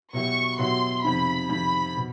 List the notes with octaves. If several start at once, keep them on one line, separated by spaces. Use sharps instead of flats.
B2 F#3 B3 E4 G4 C#6
B2 F#3 B3 E4 G4 C6
F2 C3 D#3 B5
F2 C3 D#3 B5
B2